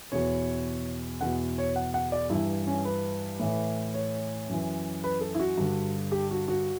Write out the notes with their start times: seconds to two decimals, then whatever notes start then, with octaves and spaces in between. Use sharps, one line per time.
0.12 E2 B2 C#5
1.21 E2 B2 F#5
1.58 C#5
1.76 F#5
1.94 F#5
2.12 D5
2.30 G2 E3 E4
2.67 C#4
2.85 B4
3.40 A2 E3
3.94 C#5
4.48 F#2 E3
5.04 B4
5.21 A4
5.35 E4
5.40 F#4
5.57 G2 D3
6.12 G4
6.31 F#4
6.48 F#4